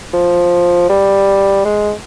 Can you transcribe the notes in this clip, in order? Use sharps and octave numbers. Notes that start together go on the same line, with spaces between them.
F3
G3
G#3